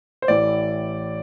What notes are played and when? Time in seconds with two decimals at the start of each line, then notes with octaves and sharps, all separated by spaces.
0.22 C5
0.28 A1 A2 E3 D5